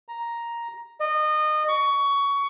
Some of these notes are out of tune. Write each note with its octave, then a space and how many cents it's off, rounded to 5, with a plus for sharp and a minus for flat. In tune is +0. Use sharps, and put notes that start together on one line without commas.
A#5 +5
D#5 -25
C#6 +20